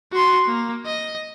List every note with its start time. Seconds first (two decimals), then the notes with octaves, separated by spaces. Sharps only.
0.12 F#4 C6
0.47 A#3
0.86 D#5